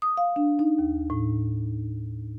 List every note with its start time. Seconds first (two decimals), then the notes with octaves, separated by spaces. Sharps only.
0.02 D#6
0.17 F5
0.36 D4
0.59 D#4
0.79 D#2
1.10 A2